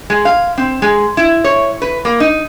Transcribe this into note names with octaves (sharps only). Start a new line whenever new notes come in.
G#3
F5
C4
G#3
E4
C#5
B4
A#3
D#4